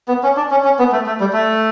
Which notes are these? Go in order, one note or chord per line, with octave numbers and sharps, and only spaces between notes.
B3
C#4
D4
C#4
C#4
B3
A3
A3
G3
A3